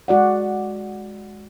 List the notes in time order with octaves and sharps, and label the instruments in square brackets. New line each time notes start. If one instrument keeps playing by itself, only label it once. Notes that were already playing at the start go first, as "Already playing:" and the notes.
[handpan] G#3 F#4 D5 F#5